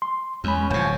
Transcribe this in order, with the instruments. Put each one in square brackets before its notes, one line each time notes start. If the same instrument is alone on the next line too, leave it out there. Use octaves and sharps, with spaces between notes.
[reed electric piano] C6
[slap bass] E2 [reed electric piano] G#3 B5 [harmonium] C#4
[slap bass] D1 C3 [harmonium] F3 C#5 [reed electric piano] G#5 G6